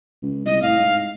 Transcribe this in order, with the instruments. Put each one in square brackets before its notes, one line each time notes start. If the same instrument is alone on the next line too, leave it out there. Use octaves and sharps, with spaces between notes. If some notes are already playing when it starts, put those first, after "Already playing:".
[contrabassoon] C#2
[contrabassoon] C2 [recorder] D#5
[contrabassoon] A2 [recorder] F5
[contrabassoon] G#2